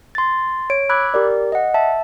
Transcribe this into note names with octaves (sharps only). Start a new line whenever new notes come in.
C6 A6
C#5 D7
B5 D6 E6 F#6 G#6
G4 A#4 D5
D#5 F#5
E5 A5